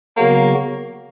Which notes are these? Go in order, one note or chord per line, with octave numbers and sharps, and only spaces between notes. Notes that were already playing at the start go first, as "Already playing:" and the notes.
C#3 F#3 A#3 B3 F#4